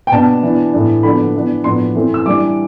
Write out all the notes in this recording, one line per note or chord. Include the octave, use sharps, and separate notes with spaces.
G5
B2 B3 D4 A5
E3 B3 D4
A2 E3 B3 D4
D3 F3 B3 D4 B5
E3 B3 D4
A2 F3 B3 D4 C6
E3 A3 C4
E6
E3 G3 D4 D6